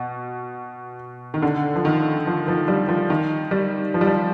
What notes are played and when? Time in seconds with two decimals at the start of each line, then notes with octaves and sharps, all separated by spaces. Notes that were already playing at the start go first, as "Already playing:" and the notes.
Already playing: B2
1.34 D#3
1.42 D3
1.76 F3
1.85 D#3
2.27 F3
2.48 F3
2.68 G3
2.89 F3
3.10 D#3
3.51 G3
3.94 F3
4.01 G3
4.07 F3